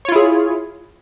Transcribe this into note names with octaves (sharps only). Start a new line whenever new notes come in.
E4 F4 G#4 C#5